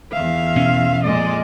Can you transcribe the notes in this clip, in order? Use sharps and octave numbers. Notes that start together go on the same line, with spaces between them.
E2 E5 F5
B2 C#4
F2 A#2 G#3 D5 D#5